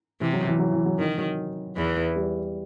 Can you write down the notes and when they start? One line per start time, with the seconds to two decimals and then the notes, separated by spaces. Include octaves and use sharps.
0.21 C3 E3
0.33 F#3
0.47 E3
0.59 F#3
0.73 E3
0.86 F#3
0.98 D#3 E3
1.18 F#3
1.77 E2 E3
2.16 G3